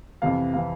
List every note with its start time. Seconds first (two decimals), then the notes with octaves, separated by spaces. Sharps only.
0.22 F2 C3 E3 F5
0.54 C3 E3 F5